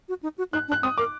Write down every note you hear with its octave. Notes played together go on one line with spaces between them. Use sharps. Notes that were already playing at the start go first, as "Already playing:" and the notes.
F#4
D#4
F#4
D#4 F#6
D4
F#6
C4 D#6
A#4 D6